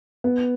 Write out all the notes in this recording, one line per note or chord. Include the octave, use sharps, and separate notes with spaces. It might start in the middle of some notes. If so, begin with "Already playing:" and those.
B3